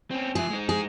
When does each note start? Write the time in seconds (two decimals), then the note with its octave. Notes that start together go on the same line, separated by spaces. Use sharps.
0.11 C4 C#4
0.35 F3 G#4 E5
0.50 G#3 D#4
0.69 G#4